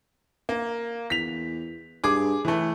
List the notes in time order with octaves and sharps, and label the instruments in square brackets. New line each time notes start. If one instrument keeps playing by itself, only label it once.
[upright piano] A#3
[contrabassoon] E2 [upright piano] B6 F7
[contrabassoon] G2 [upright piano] G#4 D6
[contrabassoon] A2 [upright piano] E3 A3